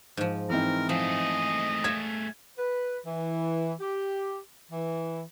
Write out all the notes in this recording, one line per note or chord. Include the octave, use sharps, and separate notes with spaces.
G#2 F3
E3 C4 D#4 A#4
F3 A3 G#4 D#5
C#5 E5 F5 G#6
B4
E3
G4
E3